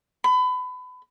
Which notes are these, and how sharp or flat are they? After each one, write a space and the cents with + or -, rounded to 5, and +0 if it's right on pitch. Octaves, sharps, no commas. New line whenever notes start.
B5 +30